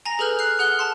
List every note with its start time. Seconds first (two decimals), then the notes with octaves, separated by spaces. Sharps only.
0.05 G#5 A#5 A#6
0.19 G#4 A4 B4 F6 G6
0.39 F6 F#6 C7
0.59 G#4 F#5 F6 F#6 G7
0.79 A5 C6